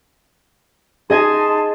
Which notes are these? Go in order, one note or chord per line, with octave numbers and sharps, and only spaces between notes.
D#4 G#4 D#5 G#5 A5 C6